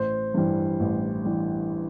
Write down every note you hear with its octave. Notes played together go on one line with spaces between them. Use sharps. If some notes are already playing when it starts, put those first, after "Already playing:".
Already playing: A1 C5
G2 E3 G3
A1
E3 G3